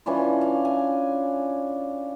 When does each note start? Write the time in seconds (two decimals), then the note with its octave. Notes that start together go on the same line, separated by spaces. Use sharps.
0.06 E3 C#4 D4 F4
0.41 F5
0.65 G#5